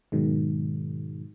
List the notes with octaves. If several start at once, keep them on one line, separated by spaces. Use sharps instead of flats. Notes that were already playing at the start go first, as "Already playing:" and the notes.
G#2 B2 D#3 F#3 G#3